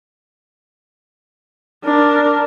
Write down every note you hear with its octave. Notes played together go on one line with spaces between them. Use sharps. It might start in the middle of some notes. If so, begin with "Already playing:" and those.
D4 A#4